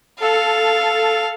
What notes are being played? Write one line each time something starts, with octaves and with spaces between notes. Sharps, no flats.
A4 F5